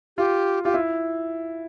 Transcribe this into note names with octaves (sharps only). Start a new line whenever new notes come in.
F4 G4
F4 G4
E4